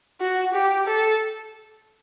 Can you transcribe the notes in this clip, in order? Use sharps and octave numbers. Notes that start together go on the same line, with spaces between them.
F#4
G4
A4